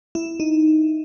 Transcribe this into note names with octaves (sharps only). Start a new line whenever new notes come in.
E4
D#4